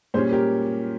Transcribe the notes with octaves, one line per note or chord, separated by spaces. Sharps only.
A#2 G3 C#4 G#4 C5
G4 A#4